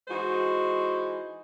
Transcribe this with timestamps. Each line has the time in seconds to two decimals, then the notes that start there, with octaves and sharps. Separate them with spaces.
0.08 E3 G#3 D#4 F#4 C5